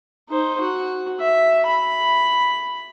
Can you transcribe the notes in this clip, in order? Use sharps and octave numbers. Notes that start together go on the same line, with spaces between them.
D#4 C5
F#4
E5
B5